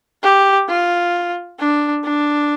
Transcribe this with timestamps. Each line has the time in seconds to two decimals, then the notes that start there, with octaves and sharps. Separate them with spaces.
0.23 G4
0.68 F4
1.60 D4
2.04 D4